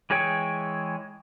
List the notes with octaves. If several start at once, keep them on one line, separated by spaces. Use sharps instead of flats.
E3 G#3 G#4 C#5 G5